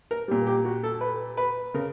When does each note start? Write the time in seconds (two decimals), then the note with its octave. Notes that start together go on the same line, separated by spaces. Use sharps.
0.11 A#4
0.28 A#2 G3
0.46 G4
0.65 F#4
0.83 A4
1.01 B4
1.37 B4
1.74 C#3 A#4